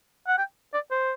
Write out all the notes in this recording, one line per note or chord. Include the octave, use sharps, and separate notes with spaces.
F#5
G5
D5
C5